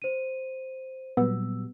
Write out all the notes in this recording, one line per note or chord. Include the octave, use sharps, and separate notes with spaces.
C5 D#7
A#2 F#3 G3 B3 E6